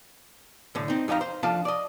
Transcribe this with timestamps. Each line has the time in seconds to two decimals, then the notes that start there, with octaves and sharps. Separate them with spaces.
0.75 A2 D3
0.88 C4 D#4
1.08 F2 D#4 G4 F5 A#5
1.21 C5
1.43 F3 D4 F4 A4 F5 A5
1.65 D5 D#5